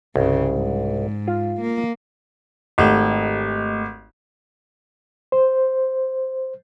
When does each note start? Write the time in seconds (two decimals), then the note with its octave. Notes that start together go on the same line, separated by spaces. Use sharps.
0.16 C2 G2 C#3
0.47 G#2
1.28 F4
1.61 A#3
2.78 G#1 A3 G4 D#5
5.32 C5